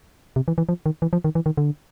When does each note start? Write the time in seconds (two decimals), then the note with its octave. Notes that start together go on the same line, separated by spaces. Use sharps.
0.36 C3
0.48 E3
0.58 E3
0.69 F3
0.86 D#3
1.02 E3
1.13 F3
1.24 D#3
1.35 E3
1.46 D#3
1.57 D3